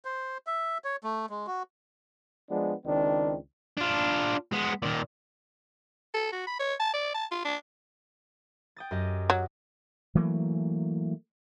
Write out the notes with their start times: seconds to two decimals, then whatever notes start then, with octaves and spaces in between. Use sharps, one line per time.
0.05 C5
0.47 E5
0.84 C#5
1.04 A3
1.30 G#3
1.47 F#4
2.50 F3 G#3 B3 D4
2.86 C#2 D#3 C4 D4
3.77 D4 F4
4.52 G#3 B3
4.82 A#2 D#3
6.14 A4
6.32 F#4
6.47 B5
6.59 C#5
6.80 A5
6.94 D5
7.15 A5
7.32 F4
7.45 D4
8.76 G5 D#6 A6
8.91 F#2 G4 D#5
9.30 F#3
10.15 E3 F#3 A3 A#3